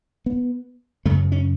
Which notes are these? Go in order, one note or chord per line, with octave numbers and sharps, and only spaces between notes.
B3
F#2 C#3 A3
C#4